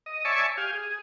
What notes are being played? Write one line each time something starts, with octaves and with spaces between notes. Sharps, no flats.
D#5
C#5 D5 E5 G#5 A5 C#6
G4 F5 G#5
G#4